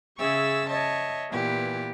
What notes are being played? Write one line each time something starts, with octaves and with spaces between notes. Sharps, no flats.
C#3 G#4 E5 C#6 E6 A6
C#5 D#5 E5 A5
A#2 E3 B3 G4